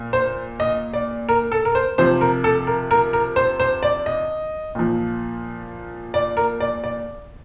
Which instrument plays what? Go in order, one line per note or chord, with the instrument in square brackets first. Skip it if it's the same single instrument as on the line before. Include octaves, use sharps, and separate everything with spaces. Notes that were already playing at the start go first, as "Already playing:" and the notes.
Already playing: [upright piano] A#2
C5
D#5
D5
A#4
A4
A#4
C5
C3 F3 C5
A#4
A4
A#4
A#4
A#4
C5
C5
D5
D#5
A#2 F3
D5
A#4
D5
D5